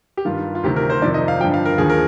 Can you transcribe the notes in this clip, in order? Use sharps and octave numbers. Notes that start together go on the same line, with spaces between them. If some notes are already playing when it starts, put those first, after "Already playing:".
G4
G2 D#3 F4
F4
D2 C3 D#3 G4
A#4
C5
F2 C3 D#3 D5
D#5
F5
G2 D3 F3 G5
F5
A#4
D#2 D3 F3 G#4
A#4